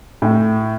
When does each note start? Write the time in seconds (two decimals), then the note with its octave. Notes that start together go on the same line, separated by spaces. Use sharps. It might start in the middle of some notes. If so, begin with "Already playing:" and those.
0.22 A2